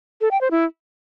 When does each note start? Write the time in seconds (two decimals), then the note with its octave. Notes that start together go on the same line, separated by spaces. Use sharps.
0.21 A4
0.31 G5
0.41 C5
0.51 E4